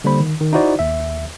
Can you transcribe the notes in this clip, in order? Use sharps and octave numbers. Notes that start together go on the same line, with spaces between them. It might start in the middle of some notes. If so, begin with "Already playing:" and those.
D3 G3 A#3 C5 B5
D#3
D#3
D#4 E4 F#4 C5 D5
D#2 E5